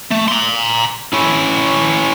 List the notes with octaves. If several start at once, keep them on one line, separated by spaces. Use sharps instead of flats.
A3
A#5 C6
C#4 E4